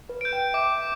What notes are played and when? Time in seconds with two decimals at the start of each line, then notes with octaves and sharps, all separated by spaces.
0.09 B4
0.21 G6 D7
0.33 G5
0.54 E5 D6